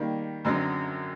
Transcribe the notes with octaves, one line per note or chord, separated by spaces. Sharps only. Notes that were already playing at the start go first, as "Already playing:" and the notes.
Already playing: D#3 G3 A#3
F#2 D3 F#3 C4